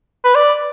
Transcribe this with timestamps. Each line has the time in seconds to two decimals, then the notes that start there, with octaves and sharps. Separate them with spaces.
0.24 B4
0.35 D5